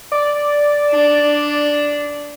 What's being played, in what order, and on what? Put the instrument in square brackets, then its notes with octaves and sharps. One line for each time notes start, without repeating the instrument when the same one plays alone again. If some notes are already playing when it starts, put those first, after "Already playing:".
[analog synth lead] D5
[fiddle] D4